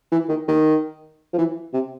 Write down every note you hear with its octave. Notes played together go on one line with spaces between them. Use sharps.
E3
D#3
D#3
F3
E3
C3